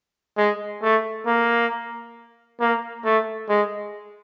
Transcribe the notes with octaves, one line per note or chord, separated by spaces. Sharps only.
G#3
A3
A#3
A#3
A3
G#3